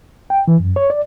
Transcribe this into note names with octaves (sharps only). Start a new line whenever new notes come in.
G5
E3
F#2
C#5
D5